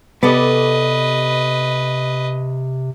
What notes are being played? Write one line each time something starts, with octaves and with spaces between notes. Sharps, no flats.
C3 B3 G4 A4 B4 D5 D#5